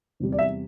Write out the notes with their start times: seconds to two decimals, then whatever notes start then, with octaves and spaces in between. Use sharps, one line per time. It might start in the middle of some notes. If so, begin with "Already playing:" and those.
0.20 E2 C3 G3
0.32 D5
0.39 E5